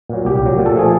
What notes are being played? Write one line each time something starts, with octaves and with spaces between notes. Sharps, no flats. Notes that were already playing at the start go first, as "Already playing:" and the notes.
A#2 F#3
C2 G4
A#2 F#3
A#2
A4
F3 A3 G#4